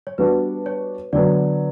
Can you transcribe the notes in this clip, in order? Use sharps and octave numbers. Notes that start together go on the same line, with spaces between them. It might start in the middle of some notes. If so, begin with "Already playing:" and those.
C#5
G3 B3 D4 F#4 B4
C#5
D3 F#3 B3 D5